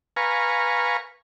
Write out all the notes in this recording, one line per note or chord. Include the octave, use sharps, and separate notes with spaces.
B4 F5 G#5 A#5 C#6